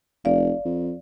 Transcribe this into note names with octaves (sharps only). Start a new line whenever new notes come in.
F1 D5 F5
F2